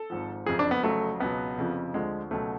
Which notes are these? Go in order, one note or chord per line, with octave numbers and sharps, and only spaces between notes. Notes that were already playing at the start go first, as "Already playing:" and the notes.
Already playing: A4
G#1 G#2 F3
F#1 F2 F3 G#4
D4
B3
F1 F2 C#3 F#3 A3
C#2 B2 F#3 B3
F1 F2 C#3 F3
D2 D3 F3 G#3
C#2 B2 F#3 A3